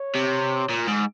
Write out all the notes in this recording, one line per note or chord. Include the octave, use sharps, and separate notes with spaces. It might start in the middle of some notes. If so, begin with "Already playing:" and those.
Already playing: C#5
C3
A#2
G#2